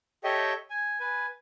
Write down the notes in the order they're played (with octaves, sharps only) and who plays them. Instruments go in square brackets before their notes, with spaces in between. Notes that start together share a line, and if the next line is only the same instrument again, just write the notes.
[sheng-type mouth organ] G4 A4 C#5 D#5 E5 G5
G#5
B4 G#5